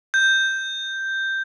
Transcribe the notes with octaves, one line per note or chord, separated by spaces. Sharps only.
G6